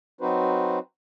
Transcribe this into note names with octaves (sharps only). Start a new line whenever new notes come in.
F#3 C4 D#4 F#4 B4 C5